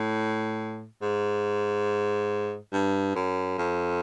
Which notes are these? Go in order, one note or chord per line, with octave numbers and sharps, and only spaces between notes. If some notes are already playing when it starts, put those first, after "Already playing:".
Already playing: A2
G#2
G2
F#2
F2